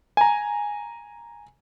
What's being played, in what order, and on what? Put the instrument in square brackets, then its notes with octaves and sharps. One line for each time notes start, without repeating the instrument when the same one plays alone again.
[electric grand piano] G#5 A#5